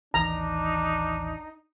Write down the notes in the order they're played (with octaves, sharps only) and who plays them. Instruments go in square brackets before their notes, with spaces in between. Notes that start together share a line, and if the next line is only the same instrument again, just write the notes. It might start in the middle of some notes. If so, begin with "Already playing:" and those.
[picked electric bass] A1 D#2 E3 [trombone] D4 [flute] D#4 [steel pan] A#5